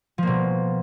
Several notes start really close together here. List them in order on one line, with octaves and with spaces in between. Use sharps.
F3 A#3 B2